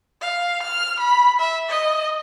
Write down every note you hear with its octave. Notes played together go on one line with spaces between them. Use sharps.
F5
F6
B5
E5
D#5